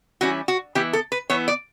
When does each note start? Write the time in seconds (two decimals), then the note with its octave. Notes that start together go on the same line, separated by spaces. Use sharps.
0.21 E3 G3 C#4 E4 F#4
0.48 F#4
0.75 E3 B3 E4 G4
0.93 A4
1.12 B4
1.30 E3 B3 E4 C#5
1.48 D5